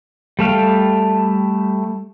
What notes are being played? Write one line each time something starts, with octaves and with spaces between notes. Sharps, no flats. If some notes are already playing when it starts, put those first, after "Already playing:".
G3 A3 F5 G5